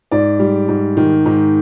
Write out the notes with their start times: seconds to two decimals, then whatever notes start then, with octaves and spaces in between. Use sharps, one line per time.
0.11 G#2 D5
0.39 G3
0.68 G#2
0.97 D#3
1.26 G#2